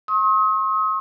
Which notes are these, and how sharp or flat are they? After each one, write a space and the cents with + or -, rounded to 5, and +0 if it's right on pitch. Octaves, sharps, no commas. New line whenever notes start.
C6 +45 D#6 +40